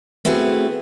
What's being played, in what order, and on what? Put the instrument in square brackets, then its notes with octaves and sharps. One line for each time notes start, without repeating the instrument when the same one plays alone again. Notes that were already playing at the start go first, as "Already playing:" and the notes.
[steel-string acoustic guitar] A3 B3 C4 E4 F#4 G#4